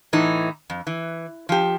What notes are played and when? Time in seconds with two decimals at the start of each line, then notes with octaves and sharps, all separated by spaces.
0.13 A2 E3 D#4
0.70 F2
0.87 E3
1.49 F3 G4